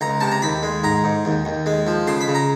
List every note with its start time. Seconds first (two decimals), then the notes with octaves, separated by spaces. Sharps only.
0.01 C#2 A#5
0.21 C3 A5
0.31 A#5
0.42 D#2 B5
0.63 G#3
0.83 G#2 A#5
1.04 G#2
1.25 D#2
1.45 D#2
1.66 G#3
1.87 F3
2.07 C#3 C6
2.21 B5
2.28 C#3
2.35 A#5